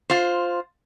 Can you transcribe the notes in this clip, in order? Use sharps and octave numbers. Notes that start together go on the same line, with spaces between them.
F4 C5